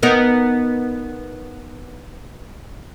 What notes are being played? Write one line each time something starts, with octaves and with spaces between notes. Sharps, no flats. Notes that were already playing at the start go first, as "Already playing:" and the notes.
B3 D#4 A#4